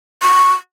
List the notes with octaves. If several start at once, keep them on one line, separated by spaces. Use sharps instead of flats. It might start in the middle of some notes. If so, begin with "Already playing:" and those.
C#6